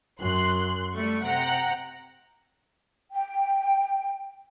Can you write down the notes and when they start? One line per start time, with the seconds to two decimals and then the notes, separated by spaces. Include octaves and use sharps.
0.20 F#2 C6 F#6
0.94 G3 A3 C#6
1.24 C3 F#5 G5 A#5
3.12 G5